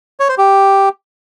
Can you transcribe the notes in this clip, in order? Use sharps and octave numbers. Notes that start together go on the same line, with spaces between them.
C#5
C5
G4